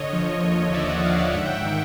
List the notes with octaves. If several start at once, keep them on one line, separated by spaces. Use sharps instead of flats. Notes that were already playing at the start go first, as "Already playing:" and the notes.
Already playing: D3 C#5 D#5
F3
D#2
D#2 D5 E5
E5 F#5
D3 D#5 F5
D5 E5
G#2 E5 F#5
G5
E5 F#5
D#3